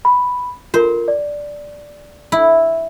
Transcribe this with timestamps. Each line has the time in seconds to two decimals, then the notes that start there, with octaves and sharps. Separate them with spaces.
0.05 B5
0.74 F4 A#4 C5
1.08 D5
2.32 E4